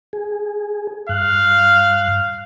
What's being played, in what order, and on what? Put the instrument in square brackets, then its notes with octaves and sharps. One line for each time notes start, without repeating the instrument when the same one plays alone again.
[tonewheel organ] G#4
[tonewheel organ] G2 F#6 [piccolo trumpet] F5